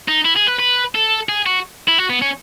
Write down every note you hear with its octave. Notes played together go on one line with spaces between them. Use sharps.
D#4
E4
G#4
B4
B4
A4
G#4
F#4
E4
F#4
B3
C#4